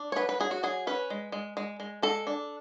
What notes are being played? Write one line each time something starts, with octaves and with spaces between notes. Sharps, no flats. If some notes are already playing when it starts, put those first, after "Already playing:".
Already playing: D4
C#5
F#3 B4
B4
F#3 G#4
F#4
F#3 G#4
C#4 B4
G#3
G#3
G#3
G#3
G#3 A4
D4